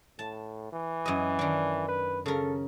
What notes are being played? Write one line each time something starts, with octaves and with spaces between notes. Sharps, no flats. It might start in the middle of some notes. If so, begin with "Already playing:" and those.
A2 A5
E3
F#2 D#5
D#3 D4
B4
C#3 A4 A#4